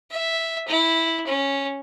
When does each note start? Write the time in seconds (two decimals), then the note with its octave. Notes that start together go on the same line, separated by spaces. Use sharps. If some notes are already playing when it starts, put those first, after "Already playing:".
0.11 E5
0.68 E4
1.27 C#4